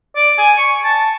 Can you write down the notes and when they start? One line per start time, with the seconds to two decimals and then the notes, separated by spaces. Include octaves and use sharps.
0.16 D5
0.38 G#5
0.58 C#6
0.84 A5